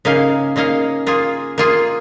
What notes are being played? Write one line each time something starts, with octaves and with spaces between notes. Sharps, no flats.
C#3 A#3 D#4 G#4 F5
C#3 A#3 D#4 G#4 F5
A#3 F4 G#4
A#3 F4 G#4